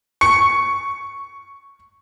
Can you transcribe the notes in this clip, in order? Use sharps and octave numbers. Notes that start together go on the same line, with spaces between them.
C#6 C#7